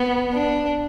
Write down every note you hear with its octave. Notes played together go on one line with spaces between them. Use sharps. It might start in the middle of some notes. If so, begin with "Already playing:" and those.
Already playing: B3
D4